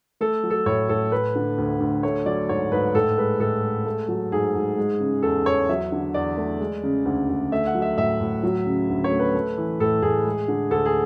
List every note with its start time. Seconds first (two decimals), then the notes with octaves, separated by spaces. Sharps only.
0.21 A3 A4
0.43 F#3
0.50 A4
0.66 A2 C#5
0.89 A2 A4
1.12 A3 B4
1.35 D3
1.58 D2
1.80 D2
2.03 A3 C#5
2.26 F#3 D5
2.49 G#2 C#5
2.72 G#2 B4
2.95 A2 A4
3.17 G#3 B4
3.40 A2 A4
3.63 G#3
3.86 A3
4.08 F#3
4.32 G#2 G#4
4.55 G#2
4.78 G#3
5.00 C#3
5.23 E2 A4
5.46 E2 C#5
5.69 F#3 E5
5.92 D3
6.14 E2 D5
6.38 A3
6.60 G#3
6.83 C#3
7.05 D2
7.29 D2
7.52 A3 E5
7.66 F#5
7.74 F#3
7.82 E5
7.98 A2 E5
8.21 A2
8.43 F#3
8.66 C#3
8.89 D2
9.04 C#5
9.12 A3
9.19 B4
9.35 A3
9.57 E3
9.80 A2 A4
10.02 A2 G#4
10.25 G#3
10.48 D3
10.71 D2 A4
10.86 G#4